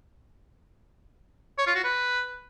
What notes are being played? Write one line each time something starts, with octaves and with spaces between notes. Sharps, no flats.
C#5
F4
F#4
B4